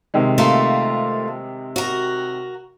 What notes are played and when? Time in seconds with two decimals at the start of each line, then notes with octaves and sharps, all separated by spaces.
0.14 C3 D#3 G#3
0.38 A3 A#3 F4
1.76 F#4 A#4